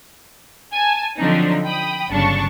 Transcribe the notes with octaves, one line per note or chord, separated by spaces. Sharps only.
G#5 A5
D3 F3 F#3 C4 D4 D#4
G5 B5 D#6
G1 C#3 F#3 D4 A5 C#6